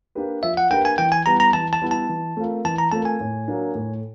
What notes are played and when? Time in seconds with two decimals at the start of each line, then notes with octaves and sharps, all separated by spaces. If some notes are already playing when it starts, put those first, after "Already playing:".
0.15 A#3 D4 G4 B4
0.43 F3 E5
0.57 F#5
0.70 A#3 D4 G4 B4 G5
0.85 G#5
0.98 E3 G5
1.12 G#5
1.26 G3 B3 E4 A#5
1.40 A#5
1.53 E3 A5
1.73 A5
1.82 G3 B3 E4
1.91 A5
2.09 E3
2.37 A3 C4 F4 A#4
2.65 E3 A5
2.79 A#5
2.92 A3 C4 F4 A#4 A5
3.05 G#5
3.20 A2
3.48 F#3 A#3 D4
3.75 A2